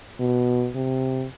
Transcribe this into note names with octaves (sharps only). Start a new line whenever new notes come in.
B2
C3